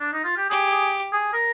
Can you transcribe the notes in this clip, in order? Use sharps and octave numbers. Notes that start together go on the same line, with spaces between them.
D4
D#4
F4
G4
G4 G#4
G#4
G#4
A#4